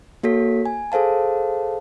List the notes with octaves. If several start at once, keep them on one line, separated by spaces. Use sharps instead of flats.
A#3 F#4 A4 C#5 B6
G#5
G#4 A4 C5 F5 A5